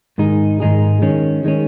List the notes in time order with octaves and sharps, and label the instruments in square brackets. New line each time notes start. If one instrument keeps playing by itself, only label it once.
[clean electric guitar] G#2 D#3 G#3 D#4 G#4
G#2 D#3 G#3 D#4 G#4
D#3 G#3 C#4
D#3 G#3 C#4